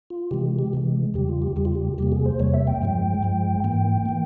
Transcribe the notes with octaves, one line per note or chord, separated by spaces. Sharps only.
F4
C3 E3 G#3 G4
G4
C3 E3 G#3
E2 C#3 G3 G4
F4
G4
E2 C#3 G3 G4
F4
G4
E2 C3 G3 A#3 G4
G#4
C5
E2 C3 G3 A#3 C#5
E5
G5
G2 F3 G#3
G2 F3 G#3
G#2 E3 A#3 G5
E3 A#3